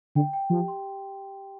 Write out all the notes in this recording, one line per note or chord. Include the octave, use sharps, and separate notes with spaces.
D3 G5
G5
F3 G4
C6